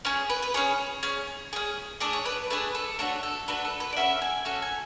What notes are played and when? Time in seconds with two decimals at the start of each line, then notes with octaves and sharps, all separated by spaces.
0.05 C#4 G#4 C#5
0.30 B4
0.42 B4
0.54 C#4 G#4 C#5
1.03 C#4 G#4
1.53 C#4 G#4
2.00 A3 D4 G#4 D5
2.13 C#5
2.25 B4
2.50 A3 D4 G#4 B4
2.75 A4
2.99 A3 D4 F#4 C#5
3.23 A4
3.48 A3 D4 F#4 B4
3.65 A4
3.80 B4
3.93 D5
3.97 C#4 F#4 A4 E5
4.22 G#5
4.45 C#4 F#4 A4
4.62 G#5